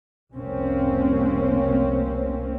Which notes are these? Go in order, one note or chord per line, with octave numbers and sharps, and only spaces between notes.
F1 C2 C3 A#3 C4 C#4